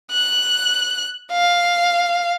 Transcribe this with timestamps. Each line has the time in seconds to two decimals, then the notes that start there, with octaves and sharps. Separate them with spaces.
0.12 F#6
1.32 F5